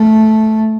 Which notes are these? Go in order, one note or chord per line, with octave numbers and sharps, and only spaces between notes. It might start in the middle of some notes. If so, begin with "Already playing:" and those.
Already playing: A3